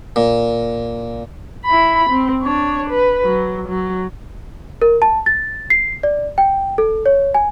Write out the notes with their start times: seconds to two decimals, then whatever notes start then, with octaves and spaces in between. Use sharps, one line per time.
0.16 A#2
1.66 E4 B5
2.09 C4
2.43 D4 C#5
2.90 B4
3.24 F#3
3.68 F#3
4.82 A#4
5.02 A5
5.26 A6
5.70 C7
6.03 D5
6.38 G5
6.78 A4
7.06 C#5
7.35 G#5